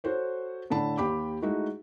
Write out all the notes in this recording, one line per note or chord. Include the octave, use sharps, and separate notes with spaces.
F#4 A4 C5 C#5
A2 D3 A5 B5
D#2 G4 B5 D6
G#3 A3 D#4 E4 F#4